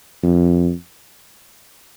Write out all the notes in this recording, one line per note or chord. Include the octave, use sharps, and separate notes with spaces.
F2